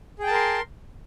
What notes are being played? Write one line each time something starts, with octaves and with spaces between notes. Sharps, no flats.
G#4 A#4 G5 A5 C6